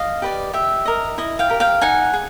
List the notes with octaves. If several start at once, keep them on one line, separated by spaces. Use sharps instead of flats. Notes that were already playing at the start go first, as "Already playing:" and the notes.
Already playing: D#5 F5
G4 B4 D5
G4 E5
A#4 D#5
E4 D#5
F5 G5
G4 A#4
F5 G5
D#4 F#5 G#5
G#4